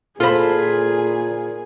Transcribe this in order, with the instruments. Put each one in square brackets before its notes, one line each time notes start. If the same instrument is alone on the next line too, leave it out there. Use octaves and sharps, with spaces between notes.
[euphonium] A#2 [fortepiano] F4 B5 [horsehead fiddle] G#4 [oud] A4 C5